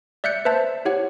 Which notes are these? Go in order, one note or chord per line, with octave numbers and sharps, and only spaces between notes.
D5 E5 F#6 G6 C#7
B4 C5 E5 A5
E4 G4 C#5 F#5